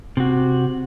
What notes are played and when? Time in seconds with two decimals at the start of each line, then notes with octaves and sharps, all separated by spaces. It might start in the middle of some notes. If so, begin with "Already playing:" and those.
0.17 C3 F#4